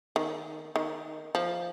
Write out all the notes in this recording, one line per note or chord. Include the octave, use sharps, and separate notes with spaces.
D#3
D#3
F3